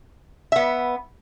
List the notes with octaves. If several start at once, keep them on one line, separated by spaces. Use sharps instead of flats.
B3 E5